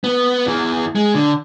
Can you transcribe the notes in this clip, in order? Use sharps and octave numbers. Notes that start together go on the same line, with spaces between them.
B3
E2 E3
G#3
D3